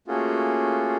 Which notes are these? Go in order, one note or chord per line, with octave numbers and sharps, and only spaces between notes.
A3 A#3 C#4 F4 F#4 G#4